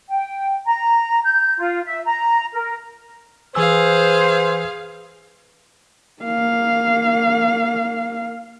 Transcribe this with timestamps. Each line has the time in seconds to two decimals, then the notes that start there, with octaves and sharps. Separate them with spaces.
0.10 G5
0.66 A#5
1.23 G6
1.57 F4
1.85 E5
2.05 A#5
2.53 A#4
3.55 E3 G#4 B4 C5 F5 G#5 E6
6.23 A#3 F5